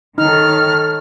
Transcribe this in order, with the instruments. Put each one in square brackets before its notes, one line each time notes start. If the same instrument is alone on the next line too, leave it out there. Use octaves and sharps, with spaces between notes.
[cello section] D#3 A4 C#5 [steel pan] D#4 [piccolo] F6